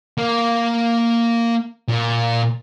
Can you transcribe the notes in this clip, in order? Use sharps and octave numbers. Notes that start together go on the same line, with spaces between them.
A#3
A#2